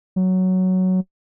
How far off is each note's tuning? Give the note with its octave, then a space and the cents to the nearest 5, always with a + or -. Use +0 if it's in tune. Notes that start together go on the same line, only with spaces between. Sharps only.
F#3 +5